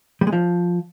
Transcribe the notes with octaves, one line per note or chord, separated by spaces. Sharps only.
G3
G#3
F3